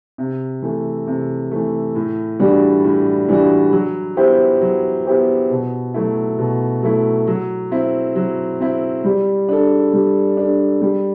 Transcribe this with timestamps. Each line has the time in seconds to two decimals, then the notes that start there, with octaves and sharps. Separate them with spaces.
0.18 C3
0.63 E3 A3
1.07 C3
1.51 E3 A3
1.95 A2
2.40 E3 G3 D4 F#4
2.84 A2
3.28 E3 G3 D4 F#4
3.72 F#3
4.17 B3 E4 G4 C5
4.61 F#3
5.05 B3 E4 G4 C5
5.50 B2
5.94 F#3 A3 E4
6.39 B2
6.83 F#3 A3 E4
7.27 F#3
7.71 C4 E4
8.16 F#3
8.60 C4 E4
9.04 G3
9.49 D4 A4
9.93 G3
10.37 D4 A4
10.82 G3